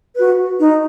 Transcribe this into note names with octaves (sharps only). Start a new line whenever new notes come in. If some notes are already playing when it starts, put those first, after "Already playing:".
F#4 B4
D#4